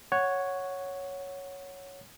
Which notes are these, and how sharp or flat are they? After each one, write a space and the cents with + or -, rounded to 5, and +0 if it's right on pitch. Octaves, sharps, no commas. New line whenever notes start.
C#5 +0 F#5 +0